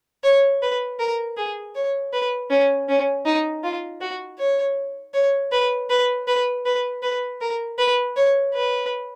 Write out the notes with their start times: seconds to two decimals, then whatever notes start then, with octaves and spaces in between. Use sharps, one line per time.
0.23 C#5
0.62 B4
0.99 A#4
1.37 G#4
1.75 C#5
2.13 B4
2.50 C#4
2.89 C#4
3.25 D#4
3.63 F4
4.01 F#4
4.38 C#5
5.14 C#5
5.52 B4
5.90 B4
6.27 B4
6.66 B4
7.02 B4
7.41 A#4
7.78 B4
8.16 C#5
8.54 B4